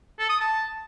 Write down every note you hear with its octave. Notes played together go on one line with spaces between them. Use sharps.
A4
D#6
A5